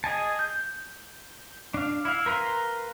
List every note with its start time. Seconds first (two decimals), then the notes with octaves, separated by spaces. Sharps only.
0.04 G#4 D#5 G#5 A5
0.39 G6
1.74 D4 F5
2.05 E4 F5
2.26 A#4 B4 F5 A#5 C6